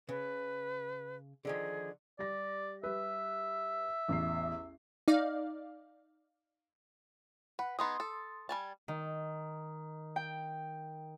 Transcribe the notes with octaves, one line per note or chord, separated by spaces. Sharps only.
C#3 B4
D3 D#3 F3 G#4
G3 D5 A#6
G3 B4 E5
A1 E2 C7
D#4 D5 F5
B4 F#5
B3 D#4 G#4 C6 D#6
A4
G3 G#5 A5
D#3
G5